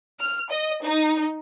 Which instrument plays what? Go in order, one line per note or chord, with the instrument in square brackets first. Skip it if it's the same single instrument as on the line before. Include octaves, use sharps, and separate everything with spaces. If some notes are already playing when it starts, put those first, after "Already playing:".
[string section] F6
D#5
D#4